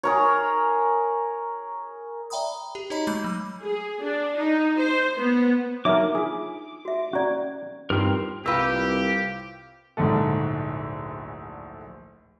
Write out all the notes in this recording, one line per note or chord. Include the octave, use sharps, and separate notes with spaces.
G#4 A#4 C#5
D5 E5 G5 A#5 B5 D#6
G4
D#4 F#4 C#5 D#5 A#5 B5
G#3 A3 B5 G6
F#3 D6
G#4
D4
D#4
C5
B3
F#3 D4 D#4 A#4 E5 D6
F4 G#4 D#6
F#4 E5
C#4 F#4 D5 A#5
G2 C4 D#4 F4 A#4
C2 A#3 F4 G4 B4 E6
D1 A#1 G#2 D3 A3 A4